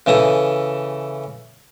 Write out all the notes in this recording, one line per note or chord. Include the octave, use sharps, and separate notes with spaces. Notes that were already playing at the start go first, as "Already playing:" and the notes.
C#3 E3 A4 D#6